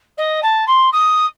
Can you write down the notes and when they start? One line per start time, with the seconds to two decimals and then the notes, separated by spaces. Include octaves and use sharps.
0.17 D#5
0.42 A5
0.67 C6
0.92 D#6